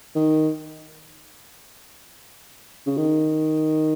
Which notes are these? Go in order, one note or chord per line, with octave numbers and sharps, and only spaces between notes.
D#3
C#3
D#3